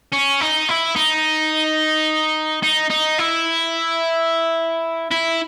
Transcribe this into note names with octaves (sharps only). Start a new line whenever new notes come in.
C#4
D#4
E4
D#4
D#4
D#4
E4
E4